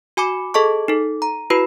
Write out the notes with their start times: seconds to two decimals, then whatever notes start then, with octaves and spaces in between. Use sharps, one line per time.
0.17 F#4 G#5 B5 D6
0.54 G#4 A4 D#5 A5 C#6
0.88 D#4 A4
1.22 A#5
1.50 E4 F#4 B4 B5